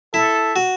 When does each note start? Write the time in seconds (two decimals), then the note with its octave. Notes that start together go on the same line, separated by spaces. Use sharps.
0.14 E4 A4
0.56 F#4